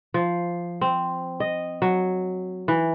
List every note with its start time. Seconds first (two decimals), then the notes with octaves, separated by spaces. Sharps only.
0.14 F3
0.81 C4
1.40 D#5
1.82 F#3
2.68 E3